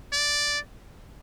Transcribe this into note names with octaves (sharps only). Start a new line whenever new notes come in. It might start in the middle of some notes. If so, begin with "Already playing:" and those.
D5